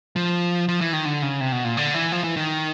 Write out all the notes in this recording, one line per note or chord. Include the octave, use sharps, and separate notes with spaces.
F3
F3
E3
D#3
D3
C#3
C3
B2
A#2
D3
E3
F3
E3
D#3